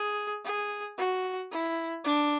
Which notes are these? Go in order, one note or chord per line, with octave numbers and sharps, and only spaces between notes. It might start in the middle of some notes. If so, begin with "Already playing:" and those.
Already playing: G#4
G#4
F#4
E4
D4